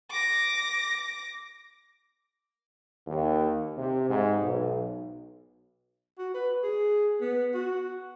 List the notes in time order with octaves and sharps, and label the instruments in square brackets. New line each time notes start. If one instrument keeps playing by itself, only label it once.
[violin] D6 A#6
[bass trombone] D#2
C3
G#2
B1
[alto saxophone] F#4
B4
G#4
B3
F#4